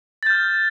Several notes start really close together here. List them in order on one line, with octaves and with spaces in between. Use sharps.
A6 G6 F6